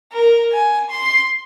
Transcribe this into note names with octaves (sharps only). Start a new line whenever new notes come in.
A#4
G#5
C6